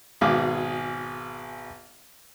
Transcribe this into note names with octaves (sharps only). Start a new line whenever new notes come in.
G#1 B2 G#4 F5 D6